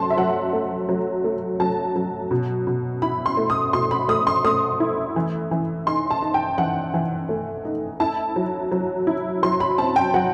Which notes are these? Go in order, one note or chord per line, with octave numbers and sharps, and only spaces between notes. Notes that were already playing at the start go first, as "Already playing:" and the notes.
Already playing: F#3 A3 A5 C6
E5
F#3 F#5
A3
F#3
A3
F#3 A5
F#3
B2
B2
E4 B5
C6
A3
D#6
B2 C6
B5
A3 D#6
C6
A3 D#6
E4
E3
E3
D#4 C6
A5
D#4
G5
E3 F#5
E3
A3
D#4
E4 A5
F#3
F#3
E4
F#3 C6
B5
C4 A5
G5
F#3 F#5